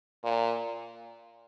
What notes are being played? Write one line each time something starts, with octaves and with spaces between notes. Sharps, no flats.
A#2